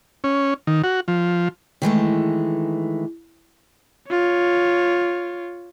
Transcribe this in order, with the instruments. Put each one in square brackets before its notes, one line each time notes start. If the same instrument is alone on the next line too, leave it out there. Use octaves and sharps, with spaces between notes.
[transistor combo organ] C#4
D#3
F#4
F3
[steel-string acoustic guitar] D#3 E3 G#3 A3
[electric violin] F4 C#5